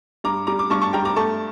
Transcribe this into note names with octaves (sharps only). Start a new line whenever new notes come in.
G2 A#5 D6
G3 A#5 D6
D6
G2 A5 C#6
A5 C#6
G2 G5 A#5
A#5 D6
A3 A5 C#6